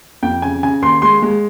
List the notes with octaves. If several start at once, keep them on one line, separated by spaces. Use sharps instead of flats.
F2 G5
C#3 G#5
C#3 G#5
D#2 C6
G#3 C6
G#3